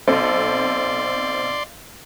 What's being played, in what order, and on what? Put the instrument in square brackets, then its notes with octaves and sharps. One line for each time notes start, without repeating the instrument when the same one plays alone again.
[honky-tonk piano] B1 C4 A4 [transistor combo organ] D5 C6